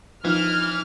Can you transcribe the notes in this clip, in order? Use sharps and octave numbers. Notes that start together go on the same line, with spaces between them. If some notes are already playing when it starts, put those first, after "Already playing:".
E3 F3 D#4 F6